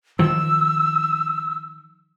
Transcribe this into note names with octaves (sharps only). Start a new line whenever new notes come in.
D#3 F3 E6